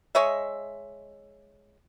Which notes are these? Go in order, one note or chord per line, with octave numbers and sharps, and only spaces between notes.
G#3 C#5 D#5 E5